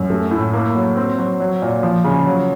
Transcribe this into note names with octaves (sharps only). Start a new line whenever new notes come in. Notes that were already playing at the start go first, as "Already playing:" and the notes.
Already playing: F#2
A3
A2
A#3
F#3
C4
F#3
F#3
A#2
F3
C#3
F#3